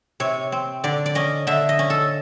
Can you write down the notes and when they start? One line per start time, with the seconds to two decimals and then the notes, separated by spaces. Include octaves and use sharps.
0.20 C3 C#5
0.52 C4
0.84 D3 D5
1.06 D5
1.15 C#4 D#5
1.47 D3 E5
1.69 D#5
1.79 C#4
1.90 A4